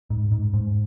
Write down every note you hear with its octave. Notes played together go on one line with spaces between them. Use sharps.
G#2
G#2
G#2